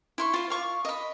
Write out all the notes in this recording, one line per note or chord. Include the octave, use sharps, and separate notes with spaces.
E4 C6 C#6
F4 C5
F5 C#6 D6
D#5 B5